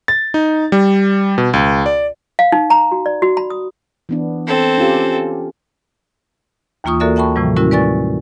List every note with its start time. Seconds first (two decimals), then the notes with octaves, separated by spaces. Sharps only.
0.08 A6
0.34 D#4
0.72 G3
1.38 B2
1.53 C#2
1.86 D5
2.39 F5
2.52 D#4
2.70 A#5
2.92 F#4
3.06 D5
3.22 F#4
3.37 B5
3.50 D#6
4.09 E3 B3 D4
4.47 C4 A4
4.78 C#4 F4 G4
6.84 D#2 E3 A#3 F4 C#6 D#6
7.00 A#3 F#4 A4 A#4 D5 E5
7.16 E5 G5 A5 B5 C#6
7.36 A2 C3 E3 F3 G3
7.57 G#3 C#4 E4 F#4 A#4
7.71 B4 D5 G#5 C#6 A6